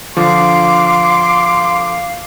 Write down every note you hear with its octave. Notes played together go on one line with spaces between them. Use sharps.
D3 F3 F5 C6 D6